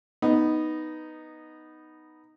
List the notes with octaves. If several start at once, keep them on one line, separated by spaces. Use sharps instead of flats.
B3 D#4